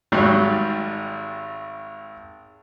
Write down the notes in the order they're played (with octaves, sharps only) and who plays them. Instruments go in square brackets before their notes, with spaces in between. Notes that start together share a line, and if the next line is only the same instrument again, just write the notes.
[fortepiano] G#1 G#2 F#3 G3